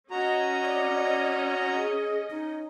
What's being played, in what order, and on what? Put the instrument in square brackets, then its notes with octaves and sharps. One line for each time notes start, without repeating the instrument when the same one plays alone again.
[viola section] C#4 D#5 [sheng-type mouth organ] F#4 A#5
[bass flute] D5
G#4
D#4